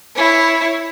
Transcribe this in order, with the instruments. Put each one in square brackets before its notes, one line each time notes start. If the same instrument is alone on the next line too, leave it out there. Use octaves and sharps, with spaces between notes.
[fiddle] E4 C#5